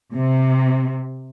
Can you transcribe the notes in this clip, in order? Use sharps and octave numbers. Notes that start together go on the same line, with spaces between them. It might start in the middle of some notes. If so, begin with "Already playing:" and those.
C3